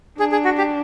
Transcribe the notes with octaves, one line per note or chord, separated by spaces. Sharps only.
D4 G#4
G#4
F#4
G4